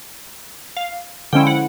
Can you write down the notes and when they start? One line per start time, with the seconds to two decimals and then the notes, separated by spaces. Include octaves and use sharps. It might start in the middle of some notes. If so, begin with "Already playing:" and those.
0.77 F5
1.33 D3 F3 G#3 C#4 E4 G5
1.47 F#5